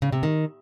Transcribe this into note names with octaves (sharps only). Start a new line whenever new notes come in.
C#3
C3
D#3